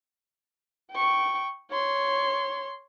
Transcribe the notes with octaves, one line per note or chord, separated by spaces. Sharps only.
G5 C#6
C#5 C6